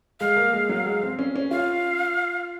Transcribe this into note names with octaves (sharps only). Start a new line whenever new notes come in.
G#3 F5
A#3
G#3
F#3
G#3
C4
C#4
C#4
F4 F5